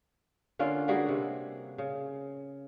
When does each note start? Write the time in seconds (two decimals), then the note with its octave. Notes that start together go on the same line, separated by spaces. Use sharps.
0.59 D3 A#3 C#4 F4
0.88 G3 A#3 F#4 G#4
1.08 C3
1.78 C#3